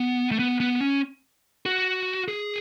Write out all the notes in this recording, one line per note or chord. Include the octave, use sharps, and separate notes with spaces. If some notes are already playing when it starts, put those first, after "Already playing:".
Already playing: B3
A3
B3
B3
C#4
F#4
G#4